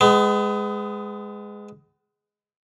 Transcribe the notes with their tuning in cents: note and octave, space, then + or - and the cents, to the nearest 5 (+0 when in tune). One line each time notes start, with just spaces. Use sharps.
G#3 +0 B3 +35